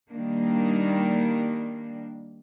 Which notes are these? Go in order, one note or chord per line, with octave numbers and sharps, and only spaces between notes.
D#3 G3 A#3 D4